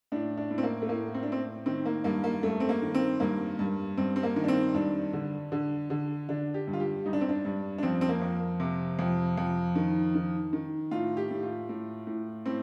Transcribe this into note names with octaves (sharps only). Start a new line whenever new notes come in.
A2 D4
D4
A2
C4
A#3
A3
A2 A#3
C4
D4
A2 C4
D#3 C4
A#3
G2 A#3
A#3
G2 A3
C4
A#3
D#3
C4
G2 A#3
G2
G2 C4
C4
A#3
D#3
D4
C4
G2 D4
D3
D3
D3
D3 D4
G4
G2
F4
G4
G2 D#4
D4
C4
D4
G2
D4
F2 C4
C4
A#3
F2
C3
F2
F2
D#3
D#3
D#3
A2 F4
G4
A2
F4
A2
A2
A2 C4